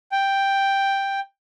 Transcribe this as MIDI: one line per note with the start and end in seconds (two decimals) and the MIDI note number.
0.12 1.20 79